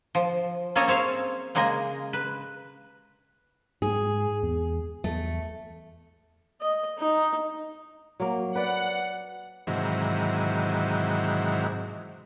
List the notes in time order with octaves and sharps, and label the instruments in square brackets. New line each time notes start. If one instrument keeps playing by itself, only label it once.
[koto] F3
A#3 C#4 G#4 A4 C#5 D#5
C4 C#5 E5 F5
C#3 G#3 A#3 G#4 D#5
B4
[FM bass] G#2 [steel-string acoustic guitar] G#4
[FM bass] E2
[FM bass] E2 [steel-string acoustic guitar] A3
[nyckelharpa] D#5
D#4
[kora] F#3 A#3
[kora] B4 D5 [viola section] F#5
[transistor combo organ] G#2 C3 D#3 E3 F#3